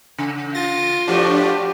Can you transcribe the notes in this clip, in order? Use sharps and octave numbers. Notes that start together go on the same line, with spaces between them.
C#3
F4 A6 A#6
A2 F3 A3 D4 F#4 G4